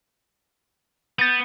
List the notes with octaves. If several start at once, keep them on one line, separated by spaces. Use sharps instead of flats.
B3 G6 A6